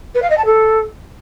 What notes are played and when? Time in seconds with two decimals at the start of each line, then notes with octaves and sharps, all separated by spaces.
0.15 B4
0.22 F5
0.30 D#5
0.38 A5
0.45 A4